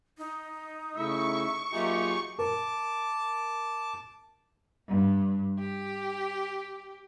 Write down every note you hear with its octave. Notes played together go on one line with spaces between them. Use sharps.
D#4
C#3 A3 E4 E5 C#6 E6
F#3 A#3 D#4 F4 G4 G#4 E5
A#4 A5 D6
G2
G4